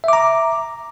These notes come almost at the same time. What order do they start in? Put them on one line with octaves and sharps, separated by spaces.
E5 D6 A#5